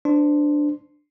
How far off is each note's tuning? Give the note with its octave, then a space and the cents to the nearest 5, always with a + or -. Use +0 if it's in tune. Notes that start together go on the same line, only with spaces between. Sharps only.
D4 +5 C5 -30 C6 +0